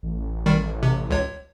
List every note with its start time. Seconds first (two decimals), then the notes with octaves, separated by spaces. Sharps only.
0.03 A1
0.46 D#3 G3
0.83 C3
1.11 C#2 C#5